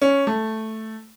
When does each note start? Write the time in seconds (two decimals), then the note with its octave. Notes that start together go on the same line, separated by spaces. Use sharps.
0.01 C#4
0.27 A3